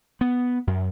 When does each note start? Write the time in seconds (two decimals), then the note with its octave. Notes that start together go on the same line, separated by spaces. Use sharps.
0.21 B3
0.67 F#2